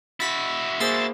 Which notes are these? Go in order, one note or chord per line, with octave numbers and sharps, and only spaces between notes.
E4 F#4 A6 B6
A#3 G#4 C5 C6 E6 A6